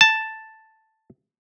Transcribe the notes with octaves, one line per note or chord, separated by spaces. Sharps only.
A5